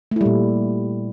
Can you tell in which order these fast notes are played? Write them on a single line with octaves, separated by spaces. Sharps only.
A3 E4 G3 A#2